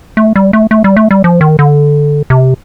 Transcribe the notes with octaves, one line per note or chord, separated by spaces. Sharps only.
A3
G3
A3
A3
G3
A3
G3
F3
D#3
D3
C3